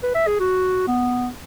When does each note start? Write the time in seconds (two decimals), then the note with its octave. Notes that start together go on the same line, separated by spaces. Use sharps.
0.03 B4
0.15 E5
0.27 G#4
0.40 F#4
0.87 B3